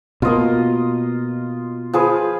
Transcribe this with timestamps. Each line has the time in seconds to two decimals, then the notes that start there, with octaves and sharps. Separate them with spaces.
0.22 B2 A#3 F4 D#5
1.93 F3 G#4 B4